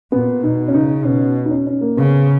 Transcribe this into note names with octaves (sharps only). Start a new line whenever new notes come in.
A#2 B3
B2 D#4
C#4
C#3 D#4
B2 C#4
D#4
C#4
C#4
A#3
C#3 B3